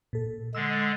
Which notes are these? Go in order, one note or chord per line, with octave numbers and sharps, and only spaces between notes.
A#2 A4
D3 G#3 E6